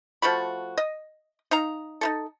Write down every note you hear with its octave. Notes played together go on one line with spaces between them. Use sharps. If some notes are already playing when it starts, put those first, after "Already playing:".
F3 A3 F#4 B5
D#5
D#4 F5 A#5
D#4 E4 A4